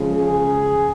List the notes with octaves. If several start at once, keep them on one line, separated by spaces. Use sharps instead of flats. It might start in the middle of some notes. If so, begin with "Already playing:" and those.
Already playing: C#3 F3 G#3
G#4